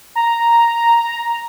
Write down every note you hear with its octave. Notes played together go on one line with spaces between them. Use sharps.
A#5